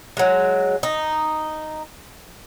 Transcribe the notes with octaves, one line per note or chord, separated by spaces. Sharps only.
F#3 G#3
D#4